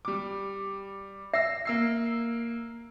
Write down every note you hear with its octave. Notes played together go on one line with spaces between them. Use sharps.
G3 D6
E5 E6 C7
A#3 E6 C7